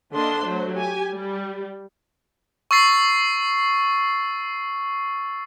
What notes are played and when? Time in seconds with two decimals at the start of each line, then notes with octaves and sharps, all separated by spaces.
0.13 D3 A#3 D4 D#5 C6
0.43 F#3 A3 C5
0.76 G4 G#5
1.12 G3
2.71 C#6 E6 A6 C7